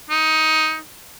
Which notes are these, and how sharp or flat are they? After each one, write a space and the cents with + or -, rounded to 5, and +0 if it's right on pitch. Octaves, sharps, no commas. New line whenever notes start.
D#4 +15